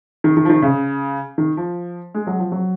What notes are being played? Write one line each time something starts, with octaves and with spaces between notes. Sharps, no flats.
D#3
D#3
F3
D#3
C#3
D#3
F3
G#3
F#3
F3
F#3